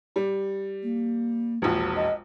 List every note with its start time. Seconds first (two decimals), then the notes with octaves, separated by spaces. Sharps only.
0.16 G3
0.83 A#3
1.62 E1 A#1
1.96 D#5